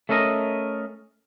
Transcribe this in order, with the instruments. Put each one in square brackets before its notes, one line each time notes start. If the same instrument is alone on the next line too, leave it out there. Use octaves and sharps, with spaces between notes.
[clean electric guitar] A3 C#4 A4 A#4 D#5